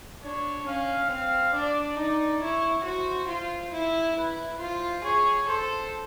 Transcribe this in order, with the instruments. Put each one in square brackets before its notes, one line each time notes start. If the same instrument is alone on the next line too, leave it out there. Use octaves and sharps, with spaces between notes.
[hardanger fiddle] D4 [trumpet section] C#5
[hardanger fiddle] C#4 [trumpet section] F5
[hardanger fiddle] C4 [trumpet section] F5
[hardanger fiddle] D4 [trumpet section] D5
[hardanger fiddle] D#4 [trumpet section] D5
[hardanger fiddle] E4 [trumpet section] C#5
[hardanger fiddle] F#4 [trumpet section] C5
[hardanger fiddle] F4
E4
[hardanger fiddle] E4 [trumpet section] B4
[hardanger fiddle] F4 [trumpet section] C5
[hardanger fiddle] G#4 [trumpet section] C#5
[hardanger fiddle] A4 [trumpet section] C5